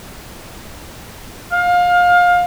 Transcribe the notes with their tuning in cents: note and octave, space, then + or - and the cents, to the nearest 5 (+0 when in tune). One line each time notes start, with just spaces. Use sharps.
F5 +25